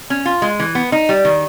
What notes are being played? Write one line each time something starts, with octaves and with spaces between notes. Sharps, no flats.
C#4
F4
G#3
E3
B3
D#4
G3
D#3